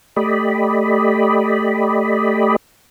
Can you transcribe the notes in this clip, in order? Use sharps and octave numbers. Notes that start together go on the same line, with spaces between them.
A3 G4 D5 D#5 B5